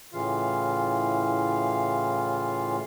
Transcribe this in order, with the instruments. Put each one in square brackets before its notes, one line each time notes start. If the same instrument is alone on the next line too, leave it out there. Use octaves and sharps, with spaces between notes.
[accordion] A2 C#3 E3 F4 F5